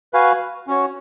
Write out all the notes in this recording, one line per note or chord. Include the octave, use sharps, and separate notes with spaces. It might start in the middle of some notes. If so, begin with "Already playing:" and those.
F#4 B4 F5 G#5
C#4 F#4 C#5